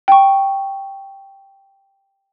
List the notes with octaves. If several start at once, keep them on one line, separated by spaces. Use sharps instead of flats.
G5 C#6